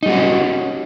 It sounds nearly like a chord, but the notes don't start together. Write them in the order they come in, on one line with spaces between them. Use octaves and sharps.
D#4 G3 F#4 C4 C#4